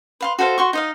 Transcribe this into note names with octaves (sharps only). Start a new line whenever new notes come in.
B4 F5 C6
F#4 A4 C5 F5
F#4 C6 C#6
D#4 D#5 F5